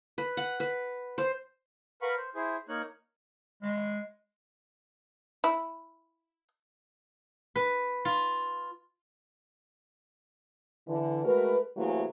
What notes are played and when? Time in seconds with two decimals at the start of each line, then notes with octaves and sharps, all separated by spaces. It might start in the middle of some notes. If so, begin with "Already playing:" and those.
0.18 B4
0.37 F#5
0.60 B4
1.18 C5
2.02 A#4 B4 F5 F#5 B5 C#6
2.17 C5
2.35 E4 G#4 C5
2.69 A#3 D#4 C#5 F#6
3.62 G#3
5.44 E4
7.56 B4
8.05 F4
10.88 D3 E3
11.25 G#3 A3 F#4 A#4 B4
11.77 C3 E3 F#3 A3 A#3 G#4